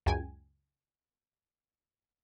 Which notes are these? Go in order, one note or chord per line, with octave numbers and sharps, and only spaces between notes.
C#2 F#2 G5 G#5